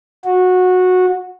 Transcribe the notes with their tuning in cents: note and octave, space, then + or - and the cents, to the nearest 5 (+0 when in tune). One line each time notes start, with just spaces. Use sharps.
F#4 -15